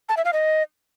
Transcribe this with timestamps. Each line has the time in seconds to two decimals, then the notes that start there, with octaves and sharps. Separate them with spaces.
0.09 A5
0.17 E5
0.25 F5
0.33 D#5